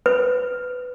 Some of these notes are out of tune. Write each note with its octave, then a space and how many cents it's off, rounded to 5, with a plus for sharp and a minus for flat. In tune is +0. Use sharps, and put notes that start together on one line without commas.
B4 +15